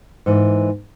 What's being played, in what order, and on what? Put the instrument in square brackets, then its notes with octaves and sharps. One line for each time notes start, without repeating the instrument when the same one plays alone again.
[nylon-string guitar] G#2 E3 A#3